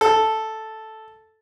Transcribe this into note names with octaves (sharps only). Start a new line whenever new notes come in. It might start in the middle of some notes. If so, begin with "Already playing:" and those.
A4